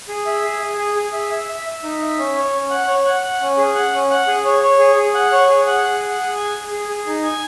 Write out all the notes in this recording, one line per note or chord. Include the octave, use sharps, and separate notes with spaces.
G#4
E5
G#4
G#4
G#4
G#4
E5
E5
E5
E5
D#4
E5
C#4
C#5
C#4
F#5
C#5
F#5
F#5
C#4
G#4
F#5
C#4
F#5
G#4
C#5
C#5
G#4
G#4
F#5
C#5
G#4
F#5
G#4
F#5
G#4
G#5
G#4
G#4
G#4
D#4
G#5